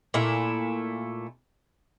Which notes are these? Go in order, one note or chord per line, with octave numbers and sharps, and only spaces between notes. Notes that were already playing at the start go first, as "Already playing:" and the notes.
A#2 A3 E4